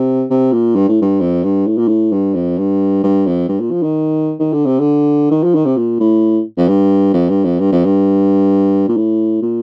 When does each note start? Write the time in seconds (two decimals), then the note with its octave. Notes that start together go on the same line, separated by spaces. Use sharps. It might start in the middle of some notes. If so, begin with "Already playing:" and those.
Already playing: C3
0.30 C3
0.53 A#2
0.76 G2
0.89 A2
1.02 G2
1.21 F2
1.44 G2
1.67 A2
1.78 A#2
1.88 A2
2.12 G2
2.34 F2
2.58 G2
3.03 G2
3.27 F2
3.49 G2
3.61 A#2
3.71 F3
3.83 D#3
4.40 D#3
4.53 D3
4.66 C3
4.80 D3
5.31 D#3
5.43 F3
5.55 D#3
5.66 C3
5.77 A#2
6.00 A2
6.57 F2
6.68 G2
7.14 F2
7.29 G2
7.45 F2
7.60 G2
7.72 F2
7.85 G2
8.89 A#2
8.97 A2
9.42 A#2